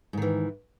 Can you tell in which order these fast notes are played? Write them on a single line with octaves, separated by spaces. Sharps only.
G#2 D#3 E3